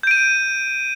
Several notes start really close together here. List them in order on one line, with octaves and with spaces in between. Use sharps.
G6 D7 D#7